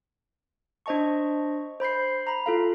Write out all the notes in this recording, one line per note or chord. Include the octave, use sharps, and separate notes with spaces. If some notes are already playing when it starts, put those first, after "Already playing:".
D4 C5 D#5 A5 C#6
C5 B5 G6 C7
A#5 B5
F4 A4 F5